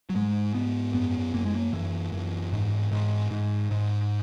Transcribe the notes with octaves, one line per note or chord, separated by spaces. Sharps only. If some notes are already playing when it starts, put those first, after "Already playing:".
F#3
G#2 G#3
G#2 B3
F#2 B3
F#2 A#3
G#3
A#3
F#2 E3
F#2 E3
G#2
G#2
G#2
G#2